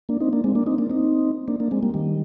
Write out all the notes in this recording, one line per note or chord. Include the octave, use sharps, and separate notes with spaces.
A#3 D4
C4 D#4
A#3 D4
G#3 C4
A#3 D4
C4 D#4
A#3 D4
C4 D#4
A#3 D4
A#3 D4
G#3 C4
G3 A#3
D#3 G3